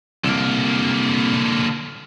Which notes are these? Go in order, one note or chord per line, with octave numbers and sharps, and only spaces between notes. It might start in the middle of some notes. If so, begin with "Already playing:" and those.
C2 D3 A#3